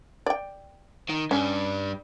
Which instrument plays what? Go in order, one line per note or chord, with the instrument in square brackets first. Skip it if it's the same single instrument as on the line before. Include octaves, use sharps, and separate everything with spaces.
[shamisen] D5 G5
[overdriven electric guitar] D#3
[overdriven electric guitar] G2 G3 [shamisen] C#4